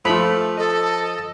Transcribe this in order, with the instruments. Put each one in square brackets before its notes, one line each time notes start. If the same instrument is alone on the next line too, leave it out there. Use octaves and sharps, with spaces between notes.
[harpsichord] F3 [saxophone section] A3 [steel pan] F4 B5
[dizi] A4 [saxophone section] D#5